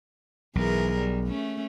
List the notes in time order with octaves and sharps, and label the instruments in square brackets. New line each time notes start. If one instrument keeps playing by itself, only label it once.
[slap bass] B1 [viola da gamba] E3 G#4 A#4
[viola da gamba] G3
A3 C#4